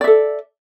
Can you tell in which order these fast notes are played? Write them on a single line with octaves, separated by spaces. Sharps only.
D5 E5 A4